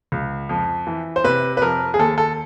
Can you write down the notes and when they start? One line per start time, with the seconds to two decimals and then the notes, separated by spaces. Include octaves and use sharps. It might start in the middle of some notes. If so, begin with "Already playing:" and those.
0.12 C#2
0.49 F2
0.87 E3
1.16 C5
1.24 C3 B4
1.57 B4
1.62 F2 A#4
1.94 G#4
1.99 D#2 A4
2.18 A4